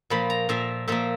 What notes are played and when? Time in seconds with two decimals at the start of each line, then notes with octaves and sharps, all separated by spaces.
0.10 A#2 F3 A#3 B5
0.30 A#5
0.49 A#2 F3 A#3 E5
0.88 A#2 F3 A#3 E5